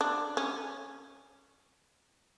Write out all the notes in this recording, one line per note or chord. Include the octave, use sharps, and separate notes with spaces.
D4
C#4